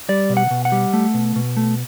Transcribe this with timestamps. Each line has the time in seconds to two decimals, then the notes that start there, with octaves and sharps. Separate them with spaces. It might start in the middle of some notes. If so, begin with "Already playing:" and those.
0.09 G3 D5
0.29 B2
0.37 F#5
0.51 B2
0.65 F#5
0.72 G3
0.93 A3
1.14 B2
1.36 B2
1.57 A3